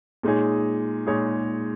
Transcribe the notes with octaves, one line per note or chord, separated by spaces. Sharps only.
A#2 G#3 D#4 G#4 C#5
A#2 G#3 D#4 G#4 C#5